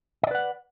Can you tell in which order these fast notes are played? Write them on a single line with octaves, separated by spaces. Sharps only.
D#5 D5 B4 F#5